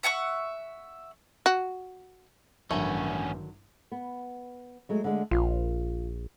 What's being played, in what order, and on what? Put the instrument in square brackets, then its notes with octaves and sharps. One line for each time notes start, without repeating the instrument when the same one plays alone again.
[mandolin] E5 F#5 G#5 C#6
[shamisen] F#4
[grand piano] A1 G2 [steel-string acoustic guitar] D3 D#3 F#3 [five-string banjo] A3 [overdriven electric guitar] B3 C#4
[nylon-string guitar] B3
F#3 G#3 A3
D3 G#3 A3
[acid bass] A#1 [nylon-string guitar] F4